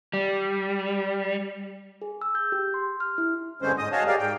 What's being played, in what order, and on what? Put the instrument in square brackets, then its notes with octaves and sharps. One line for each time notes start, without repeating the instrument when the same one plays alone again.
[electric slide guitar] G3
[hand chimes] G#4
E6
G6
G4
C6
F6
E4
[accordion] G2 D3 G#3 C4 C#4 C5
G#2 D#5 D#6
F#4 G#4 C#5 D#5 F5 A5
G4 G#4 A#4 D5 F5
G#2 G5